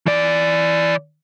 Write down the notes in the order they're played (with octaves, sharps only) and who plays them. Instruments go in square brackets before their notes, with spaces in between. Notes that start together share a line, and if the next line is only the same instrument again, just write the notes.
[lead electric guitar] E3 D5